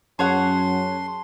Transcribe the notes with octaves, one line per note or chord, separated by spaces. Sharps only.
F#2 G#4 C#5 F#5 A5 C6